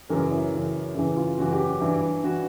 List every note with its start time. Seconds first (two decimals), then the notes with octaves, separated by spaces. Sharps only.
0.09 F#2 C#3 E3 A#4
0.31 E4
0.53 F#2 C#3 E3
0.95 F#2 C#3 E3 E4
1.16 F4
1.39 F#2 C#3 E3 F#4
1.52 G4
1.67 F#4
1.82 G2 E3 E4
2.24 E3 F#4